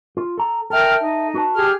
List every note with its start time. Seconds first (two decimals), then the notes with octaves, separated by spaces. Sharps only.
0.17 F4
0.38 A4 A#5
0.70 A4 A#4 E5 G5 F6
0.97 D#4
1.34 F#4 B4 A5
1.54 G4 G#4 F6